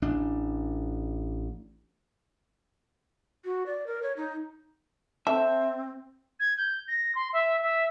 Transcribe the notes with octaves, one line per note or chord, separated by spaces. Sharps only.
A1 D4
F#4
D5
A#4
C#5
D#4
C4 A4 E5
G#6
G6
A#6
C6
E5
E5